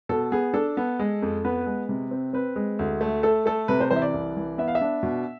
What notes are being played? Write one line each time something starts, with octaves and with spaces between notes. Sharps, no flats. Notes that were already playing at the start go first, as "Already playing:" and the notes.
B2 A4
B3 G#4
D4 A4
B3
G#3
F2
B3 B4
G#3
C3
C4
C4 B4
G#3
D2
A3
A3 A4
A3 A4
C3 B4
C5
E3 C5
E5
D5
C2
E3
B3 E5
F5
E5
D4
B2